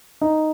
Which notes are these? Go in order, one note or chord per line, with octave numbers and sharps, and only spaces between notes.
D#4